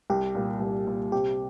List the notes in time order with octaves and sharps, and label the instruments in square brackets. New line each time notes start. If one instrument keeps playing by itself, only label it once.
[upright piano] C2 [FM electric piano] G4
[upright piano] A#2 G3
C2
A#2 G3
[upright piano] C3 [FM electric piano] G4